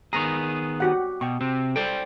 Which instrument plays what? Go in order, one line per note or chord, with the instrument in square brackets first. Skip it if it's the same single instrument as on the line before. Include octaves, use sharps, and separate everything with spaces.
[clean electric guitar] D#3 B3 G#4 [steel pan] A#5 C#6
[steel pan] F#4 G4 F#5
[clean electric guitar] B2 [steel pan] G5 C#6
[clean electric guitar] C3 C4
[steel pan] A4 [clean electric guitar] C5 D5 G5